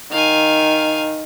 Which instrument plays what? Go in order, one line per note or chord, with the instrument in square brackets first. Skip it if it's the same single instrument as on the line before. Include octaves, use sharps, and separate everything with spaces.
[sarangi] D#3 [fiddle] F5 G#5